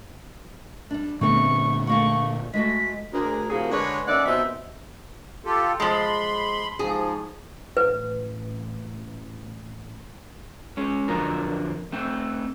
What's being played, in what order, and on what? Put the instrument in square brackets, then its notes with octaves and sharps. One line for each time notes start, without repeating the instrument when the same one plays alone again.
[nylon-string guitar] G3 D4
[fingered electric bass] A#2 D3 B3 [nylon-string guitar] G3 A3 C4 [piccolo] C#6
[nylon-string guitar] A3 A#3 F#5 [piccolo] C#6
[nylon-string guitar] G#3 A3 F#4 [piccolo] B6
[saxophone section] D2 G#4 A#4
A2 C3 F3 F#4 G#4 A#4
D3 G#3 B4 C#5
D#2 C#4 D#4 D5 E5 F#5
D#2 B2 C4 D#4 E5
[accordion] F4 G4 A4
[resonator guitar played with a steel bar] F3 G#3 [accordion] B5 C6
[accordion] G#2 F3 [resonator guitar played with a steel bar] G#4
[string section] A1 [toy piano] B4
[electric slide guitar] G#3 C#4
F2 D3 F3 F#3 A#4
A3 C4 G5